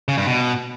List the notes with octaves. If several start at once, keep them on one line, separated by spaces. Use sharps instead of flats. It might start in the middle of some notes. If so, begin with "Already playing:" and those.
C#3
G2
B2